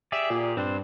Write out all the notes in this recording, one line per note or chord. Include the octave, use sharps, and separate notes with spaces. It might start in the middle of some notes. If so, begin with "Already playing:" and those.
G4 G#4 D5 E5
A#2
G2 C4 D4 C5